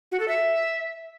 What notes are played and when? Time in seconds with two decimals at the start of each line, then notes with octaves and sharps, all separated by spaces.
0.12 F#4
0.20 A4
0.28 E5